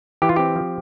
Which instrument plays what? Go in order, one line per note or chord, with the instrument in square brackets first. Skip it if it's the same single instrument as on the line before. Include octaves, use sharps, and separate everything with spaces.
[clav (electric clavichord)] E3 G4
F4
C4 G4
F3